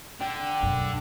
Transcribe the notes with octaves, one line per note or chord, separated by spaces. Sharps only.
D3 G5
F#2 B2